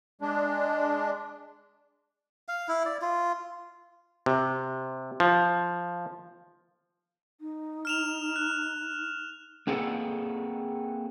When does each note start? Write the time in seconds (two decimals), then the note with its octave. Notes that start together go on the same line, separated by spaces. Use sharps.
0.21 G#3 D4
2.48 F5
2.68 E4
2.85 D5
3.02 F4
4.26 C3
5.20 F3
7.41 D#4
7.85 F6 E7 F7
8.36 F#6
9.67 A#3 C4 G#4 A4 B4 F#5